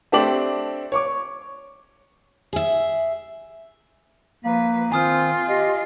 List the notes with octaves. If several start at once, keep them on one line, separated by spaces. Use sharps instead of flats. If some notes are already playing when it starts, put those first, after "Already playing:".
A3 C4 D4 G4 D6 F#7
C#5 C#6 D6
G#4 E5
F3 A#3 B4
D#3 C4 F4 G#5 D#6 F6
G4 D#5